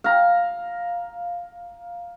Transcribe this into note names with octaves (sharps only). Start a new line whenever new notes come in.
F5 A#5